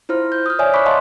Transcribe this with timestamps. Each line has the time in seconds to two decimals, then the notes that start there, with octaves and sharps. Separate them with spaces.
0.09 E4 F4 C5 F6
0.32 G6
0.46 D#6 F6
0.59 C#5 D5 E5 G#5 D#6
0.74 B5 C#6 D6 F#6 B6
0.86 D#5 F5 A5 C6 C#6